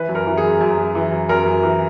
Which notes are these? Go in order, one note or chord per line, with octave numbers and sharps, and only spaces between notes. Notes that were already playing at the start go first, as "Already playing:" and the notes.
Already playing: E3 B4
F#2
A#4
E3
G#4
F#2
F#2
F#2
E3
F#2
F#2 A#4
F#2
E3